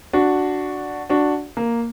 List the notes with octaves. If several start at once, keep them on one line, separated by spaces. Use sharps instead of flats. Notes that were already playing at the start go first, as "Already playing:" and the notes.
D4 F#4
D4 F#4
A#3